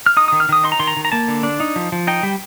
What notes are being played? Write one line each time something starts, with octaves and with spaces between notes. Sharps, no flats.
F6
D#4 D#6
D#3 D#6
F6
D#3 D#6
D#4 C6
A#5
D#3 C6
A#5
D#3
A#5
A#3 A5
D3
D4
D#4
F3
F3
D#4 G5
G3